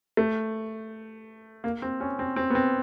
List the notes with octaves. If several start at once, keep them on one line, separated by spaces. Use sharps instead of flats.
A3
A#3
C4
C#4
C4
C4
B3
C4